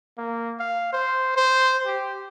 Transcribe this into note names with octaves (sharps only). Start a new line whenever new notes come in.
A#3
F5
C5
C5
G4